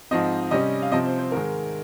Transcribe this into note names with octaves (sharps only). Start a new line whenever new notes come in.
G#2 F3 C4 D#5
C3 G3 C#4 D#5
F5
C3 F3 C4 D#5
C5
C5
G#2 D#3 G#3 A#4